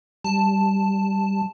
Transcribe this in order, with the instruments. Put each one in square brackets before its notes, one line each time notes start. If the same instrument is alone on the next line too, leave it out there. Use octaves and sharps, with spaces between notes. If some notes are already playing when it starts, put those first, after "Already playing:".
[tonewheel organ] G3 [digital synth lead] A5